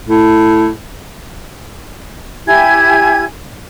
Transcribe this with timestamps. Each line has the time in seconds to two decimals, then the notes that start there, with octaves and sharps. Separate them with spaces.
0.09 A2
2.47 E4 G4 G#5 G#6